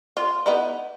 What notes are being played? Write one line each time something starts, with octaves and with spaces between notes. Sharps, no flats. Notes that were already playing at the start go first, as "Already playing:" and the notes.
F4
B3 D#4 E4